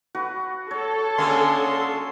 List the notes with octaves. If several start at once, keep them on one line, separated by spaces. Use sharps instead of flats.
F#4 B4
A4 C#5
D3 G#3 A#3 C#4 C6